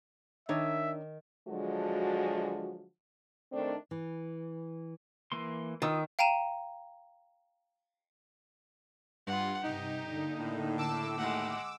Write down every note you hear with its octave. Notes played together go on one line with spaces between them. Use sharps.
D#3 D4 D#4 C#5 E5
D3 F3 F#3 G#3 F#4
D#3 A3 C4 D4
E3
E3 A#3 C6
D#3 F4 D#6 E6
F5 G5 A#5 D#7 E7
G2 F4 F#5
G2 C3 D#4 G4
D3 A#3
A2
A5 D6 E6
D#2 A2 G#3 F#5